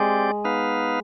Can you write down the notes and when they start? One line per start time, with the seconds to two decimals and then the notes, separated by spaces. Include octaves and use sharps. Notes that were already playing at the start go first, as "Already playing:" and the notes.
Already playing: G#3 C4 G4 D5
0.44 B3 D#4 B4 F5